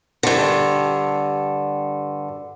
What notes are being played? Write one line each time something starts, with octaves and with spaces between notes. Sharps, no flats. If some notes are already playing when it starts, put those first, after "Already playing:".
G2 D3